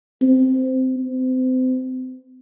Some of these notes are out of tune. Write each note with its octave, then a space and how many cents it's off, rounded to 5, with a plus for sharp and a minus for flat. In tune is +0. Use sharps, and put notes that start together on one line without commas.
C4 -15
C4 -35